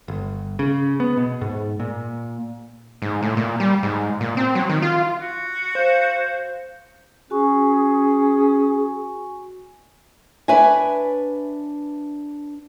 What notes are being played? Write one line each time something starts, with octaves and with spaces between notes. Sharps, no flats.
G1
C#3
B3
B2
G#2
A#2
G#2
A2
A#2
G3
G#2
A#2
C4
F#3
D#3
F4
F#4
C5 F5
C#4 F#4 G#4 G#5 C#6
D4 B4 C#5 E5 G#5